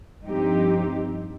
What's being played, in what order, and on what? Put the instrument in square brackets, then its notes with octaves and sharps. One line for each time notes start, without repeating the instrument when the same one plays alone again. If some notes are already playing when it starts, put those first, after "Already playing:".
[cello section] G2 F3 C4 D#4 G4